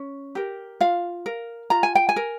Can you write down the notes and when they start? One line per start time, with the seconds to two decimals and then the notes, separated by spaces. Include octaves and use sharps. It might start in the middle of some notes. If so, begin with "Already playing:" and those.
Already playing: C#4
0.35 G4 A#4
0.81 F4 F5
1.26 A#4
1.70 F4 A#5
1.83 G#5
1.95 G5
2.09 G#5
2.16 A#4